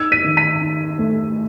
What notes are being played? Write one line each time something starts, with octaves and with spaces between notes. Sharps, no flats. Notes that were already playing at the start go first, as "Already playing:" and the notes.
Already playing: D#4 E6 G#6
B6 D#7
D#3
B6 D#7
D#4
A3